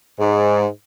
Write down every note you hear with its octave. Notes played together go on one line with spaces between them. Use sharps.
G#2